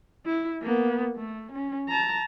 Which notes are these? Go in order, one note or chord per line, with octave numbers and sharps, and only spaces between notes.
E4
A#3 B3
A3
C#4
A5 A#5